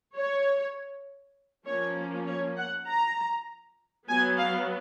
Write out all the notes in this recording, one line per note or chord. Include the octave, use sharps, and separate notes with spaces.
C#5
F3 A#3 C#4 C#5
C#5
F#5
A#5
F#3 B3 G#5
F5